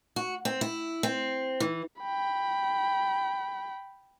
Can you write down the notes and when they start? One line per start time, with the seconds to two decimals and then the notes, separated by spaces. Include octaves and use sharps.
0.16 F#4
0.45 C4
0.61 E4
1.03 C4
1.60 E3
2.01 G5 B5